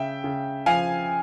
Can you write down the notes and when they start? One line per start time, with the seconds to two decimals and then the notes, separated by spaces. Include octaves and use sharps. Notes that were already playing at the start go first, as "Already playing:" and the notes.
Already playing: C#3 E5 G5
0.24 C#3
0.66 F3 F5 G#5